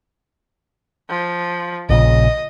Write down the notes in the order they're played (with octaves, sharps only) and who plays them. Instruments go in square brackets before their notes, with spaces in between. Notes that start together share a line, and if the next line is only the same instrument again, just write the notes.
[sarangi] F3
[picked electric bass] A#1 A#2 C#3 [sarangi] D#5